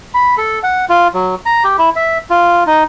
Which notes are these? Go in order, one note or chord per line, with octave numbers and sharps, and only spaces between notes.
B5
A4
F#5
F4
F#3
A#5
G4
E4
E5
F4
D#4